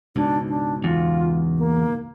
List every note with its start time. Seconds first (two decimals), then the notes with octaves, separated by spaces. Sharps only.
0.16 C#2 G#2 B2 D4
0.48 D4
0.84 E2 F4
1.58 A#3